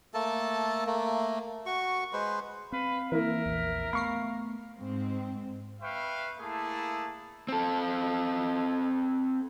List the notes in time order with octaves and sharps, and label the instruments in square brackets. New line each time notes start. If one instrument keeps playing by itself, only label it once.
[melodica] A3 A#3 A4 A5
A3 A#3
F#4 C#6
G#3 B4 C5
[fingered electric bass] C4 [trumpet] B4 [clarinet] F5
[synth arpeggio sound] E3 A#3 [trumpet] A#4 [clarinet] E5
[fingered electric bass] A#1 E2
[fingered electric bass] A3 B3 [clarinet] F5 [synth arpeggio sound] B5 C#6 C7
[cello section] G#2 C4
[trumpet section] B4 E5 F5 G5 C#6
A3 A#3 E4 G#4 A5
[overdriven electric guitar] C4 A4